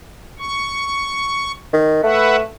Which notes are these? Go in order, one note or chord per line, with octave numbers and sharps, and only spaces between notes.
C#6
D#3
A3 B4 E5 F#5